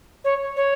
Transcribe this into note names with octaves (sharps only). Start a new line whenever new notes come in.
C#5
C#5